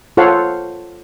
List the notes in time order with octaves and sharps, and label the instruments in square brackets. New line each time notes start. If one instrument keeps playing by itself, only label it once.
[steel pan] F4 A4 C5 C#5 F5 F#5